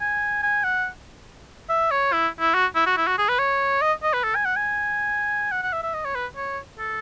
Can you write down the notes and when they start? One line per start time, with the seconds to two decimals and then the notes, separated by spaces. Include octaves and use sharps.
0.01 G#5
0.43 G#5
0.64 F#5
1.69 E5
1.91 C#5
2.13 E4
2.40 E4
2.55 F#4
2.76 E4
2.87 F#4
2.97 E4
3.07 F#4
3.18 G#4
3.29 B4
3.39 C#5
3.81 D#5
4.03 D#5
4.14 B4
4.24 A4
4.35 G#5
4.45 F#5
4.57 G#5
5.52 F#5
5.63 F#5
5.73 E5
5.83 E5
5.94 D#5
6.05 C#5
6.15 B4
6.36 C#5
6.79 A4